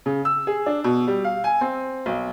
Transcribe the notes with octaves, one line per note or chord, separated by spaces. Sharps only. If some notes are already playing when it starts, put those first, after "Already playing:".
C#3
E6
G#4
D4
B2
G3
F5
G#5
C4
B1